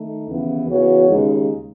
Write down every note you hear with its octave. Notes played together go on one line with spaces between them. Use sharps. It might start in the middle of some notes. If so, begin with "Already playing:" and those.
Already playing: D#3 A3 D#4
D#2 C#3 E3 B3 E4
C#3 E3 B3 F#4 C#5
D#2 C#3 G#3 D#4 G#4